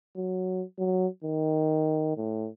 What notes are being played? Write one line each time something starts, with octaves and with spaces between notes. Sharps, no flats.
F#3
F#3
D#3
A2